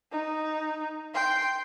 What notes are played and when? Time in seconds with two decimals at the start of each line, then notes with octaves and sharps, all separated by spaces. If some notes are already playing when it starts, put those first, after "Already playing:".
0.12 D#4
1.15 G5 C6